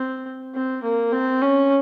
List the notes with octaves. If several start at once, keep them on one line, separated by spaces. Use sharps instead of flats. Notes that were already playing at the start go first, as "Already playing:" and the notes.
Already playing: C4
C4
A#3
C4
C#4